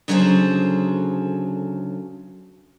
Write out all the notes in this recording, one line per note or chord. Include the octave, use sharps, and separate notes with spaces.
D2 C#3 F#3 G#4 A4 C5